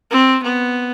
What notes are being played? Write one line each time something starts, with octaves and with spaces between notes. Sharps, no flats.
C4
B3